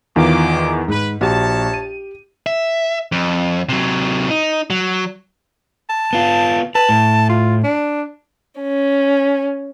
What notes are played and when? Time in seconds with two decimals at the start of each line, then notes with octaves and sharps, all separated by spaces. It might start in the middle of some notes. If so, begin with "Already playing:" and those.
0.16 E2 D#3 E3 G#3 F4 D6
0.88 G#2 B4
1.21 A#1 F#4 G4 C#5 A5
1.74 D#7
2.47 E5
3.12 F2
3.69 C3 F#3
4.30 D#4
4.70 F#3
5.90 A5
6.13 B3 F4
6.75 B4 A5
6.89 A2
7.29 F4
7.64 D4
8.61 C#4